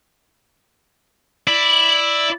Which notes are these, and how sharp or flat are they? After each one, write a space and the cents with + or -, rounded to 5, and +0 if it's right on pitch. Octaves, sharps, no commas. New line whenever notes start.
E4 +0 D5 +0